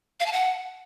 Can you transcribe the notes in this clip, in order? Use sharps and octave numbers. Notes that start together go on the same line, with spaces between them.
F5
A5
F#5